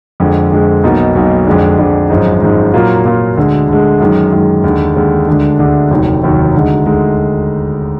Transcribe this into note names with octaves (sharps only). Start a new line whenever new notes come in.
F2 D3 G#3
F2 D3 G#3
B1 B2 A#3 D#4
B1 B2 A#3 D#4
F2 D3 G#3 D4
F2 D3 G#3 D4
G#1 F#2 F3 G#3 D#4
G#1 F#2 F3 G#3 D#4
A#2 F#3 A#3 F4
A#2 F#3 A#3 F4
D2 D3 G#3
D2 D3 G#3
F#2 D#3 G#3
F#2 D#3 G#3
D#2 D3 G#3
D#2 D3 G#3
D2 D3 G#3 D4
D2 D3 G#3 D4
F1 D#2 D#3 F#3
F1 D#2 D#3 F#3
D2 D3 G#3 D#4
D2 D3 G#3 D#4